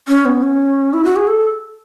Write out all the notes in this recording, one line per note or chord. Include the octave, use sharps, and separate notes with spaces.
C#4
B3
C#4
E4
F#4
G#4
A4